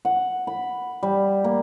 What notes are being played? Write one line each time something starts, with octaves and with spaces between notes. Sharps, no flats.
F#5
B5
G3
A#3